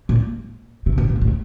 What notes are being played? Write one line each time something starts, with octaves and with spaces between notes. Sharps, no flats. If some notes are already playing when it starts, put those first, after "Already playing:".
A#2
C3
A#2
A2
A2